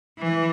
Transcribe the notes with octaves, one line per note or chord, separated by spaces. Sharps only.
E3